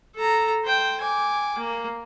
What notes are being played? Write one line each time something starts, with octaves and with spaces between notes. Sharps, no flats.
A4 A#5
C5 G5
G#5 D6
A#3